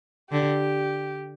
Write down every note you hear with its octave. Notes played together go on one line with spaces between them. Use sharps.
D3 G4